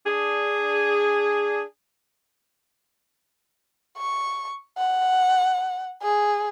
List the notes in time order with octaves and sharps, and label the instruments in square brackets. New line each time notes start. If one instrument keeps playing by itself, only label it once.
[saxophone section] D4 G#4
[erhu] C#6
F#5
G#4